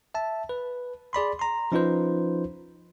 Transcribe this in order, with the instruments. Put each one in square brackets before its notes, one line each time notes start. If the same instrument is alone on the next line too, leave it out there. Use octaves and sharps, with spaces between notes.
[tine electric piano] E5 A5
B4
G#4 D5 B5 C6
A#5 C6
F3 C#4 D#4 F4 B4 C5